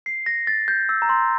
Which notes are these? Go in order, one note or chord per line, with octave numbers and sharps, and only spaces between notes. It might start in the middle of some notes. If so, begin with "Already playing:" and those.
C7
A#6
A6
G6
E6
A#5
C6